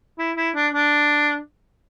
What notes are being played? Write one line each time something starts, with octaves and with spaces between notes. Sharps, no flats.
E4
E4
D4
D4